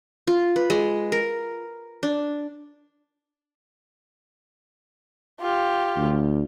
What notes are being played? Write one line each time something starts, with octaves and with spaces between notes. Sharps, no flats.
F4
B4
G#3
A#4
D4
F4 G4
D2